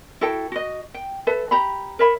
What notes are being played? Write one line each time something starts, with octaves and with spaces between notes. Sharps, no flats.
E4 F#4 A4 G5
F#4 D#5
G5
A4 B4 E5
G4 A#5 B5
A#4 C#5 E5 B5